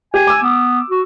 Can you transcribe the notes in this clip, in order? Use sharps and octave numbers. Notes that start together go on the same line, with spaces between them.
G4 G#5
D6 E6
B3
F#4